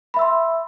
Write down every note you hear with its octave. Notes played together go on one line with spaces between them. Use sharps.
E5 B5 C6 E6